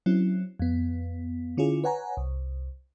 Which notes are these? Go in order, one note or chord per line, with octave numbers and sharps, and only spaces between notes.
F#3 C4 C#4 E4
F2 B3
D3 C#4 E4 F4 G#4
B4 C#5 F#5 G#5 A#5
C2